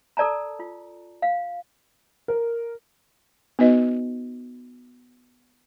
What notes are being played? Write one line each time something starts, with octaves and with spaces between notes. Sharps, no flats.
A4 A#4 D5 A5 A#5
F4
F5
A#4
B3 D#4 F#4 B4 D#5